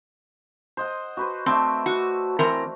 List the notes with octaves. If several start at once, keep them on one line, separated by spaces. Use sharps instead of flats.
C5 D#5 F#5
F#4 B4 C5
A3 C4 D5 E5
F#4
E3 C4 A#4